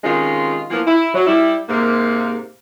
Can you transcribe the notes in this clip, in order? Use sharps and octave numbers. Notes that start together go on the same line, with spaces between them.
C3 D#3 G#3 C#4 F4
E3 F3 A#3 B3 F4
E4
F#3
G3 E4
G#2 C3 A#3